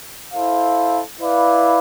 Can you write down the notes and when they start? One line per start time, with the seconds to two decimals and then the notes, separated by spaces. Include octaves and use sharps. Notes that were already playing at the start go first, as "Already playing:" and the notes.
0.32 E4 A4 C5 F5
1.20 E4 B4 D5 F5